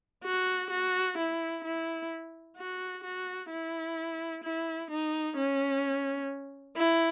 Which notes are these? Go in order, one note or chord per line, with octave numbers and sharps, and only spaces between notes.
F#4
F#4
E4
E4
F#4
F#4
E4
E4
D#4
C#4
E4